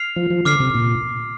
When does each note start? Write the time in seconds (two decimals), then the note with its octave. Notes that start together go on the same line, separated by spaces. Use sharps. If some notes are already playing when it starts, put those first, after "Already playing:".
Already playing: F6 C7 F7
0.16 F3
0.30 F3
0.45 D3 D6 F6 C7
0.60 C3
0.75 A#2